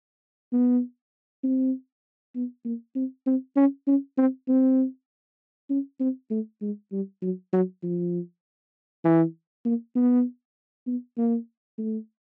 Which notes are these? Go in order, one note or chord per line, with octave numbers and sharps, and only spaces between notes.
B3
C4
B3
A#3
C4
C4
C#4
C#4
C4
C4
C#4
C4
A3
G#3
G3
F#3
F#3
F3
E3
A#3
B3
B3
A#3
A3